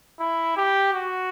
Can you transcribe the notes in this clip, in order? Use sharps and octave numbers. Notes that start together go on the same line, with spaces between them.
E4
G4
F#4